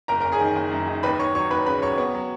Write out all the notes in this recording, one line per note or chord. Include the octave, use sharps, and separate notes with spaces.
F#1 A#4 A#5
A#4 A#5
F#1
G#4 G#5
D#3
F#1
F#2
D#3
D#2 B4 B5
D#2 C#5 C#6
F#3 C#5 C#6
D#2 B4 B5
C#3 B4 B5
F#3 C#5 C#6
B3
F#3